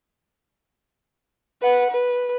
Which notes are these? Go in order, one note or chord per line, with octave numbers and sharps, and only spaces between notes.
B4 F#5
B4